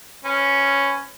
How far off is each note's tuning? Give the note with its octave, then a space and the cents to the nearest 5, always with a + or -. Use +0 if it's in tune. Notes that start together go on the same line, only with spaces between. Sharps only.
C#4 +0 B4 +30